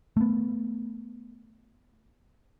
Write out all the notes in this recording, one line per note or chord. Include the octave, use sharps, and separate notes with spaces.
A3 B3